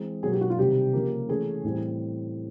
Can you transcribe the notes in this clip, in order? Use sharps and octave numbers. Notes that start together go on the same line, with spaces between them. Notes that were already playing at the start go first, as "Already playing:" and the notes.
Already playing: E3 G#3 C4
B2 F#3 A#3 G#4
G4
F#4
F4
C3 D#3 G3 G4
C#3 F3 A#3
E3 A3 C#4 G#4
A2 E3 G3 C4